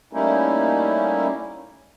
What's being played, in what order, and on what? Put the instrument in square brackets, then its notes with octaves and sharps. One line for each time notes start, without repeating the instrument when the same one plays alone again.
[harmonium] G3 A3 A#3 C#4 D#4 E4